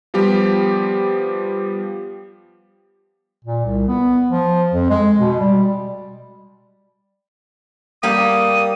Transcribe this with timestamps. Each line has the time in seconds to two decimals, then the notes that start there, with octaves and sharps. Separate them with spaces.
0.14 F3 G3 B3 G4
3.45 A#2
3.65 C2
3.88 B3
4.31 F3
4.73 F2
4.90 G#3
5.19 B2
5.40 G3
8.03 G3 A#3 G4 D#6